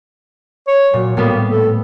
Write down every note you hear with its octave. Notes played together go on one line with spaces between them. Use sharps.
C#5
A#2 F#3
A2 G3 A#3 B3
A4